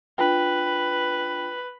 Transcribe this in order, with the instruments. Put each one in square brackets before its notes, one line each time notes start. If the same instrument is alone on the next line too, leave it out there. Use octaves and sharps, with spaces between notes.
[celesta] D4 F4 G5 [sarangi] B4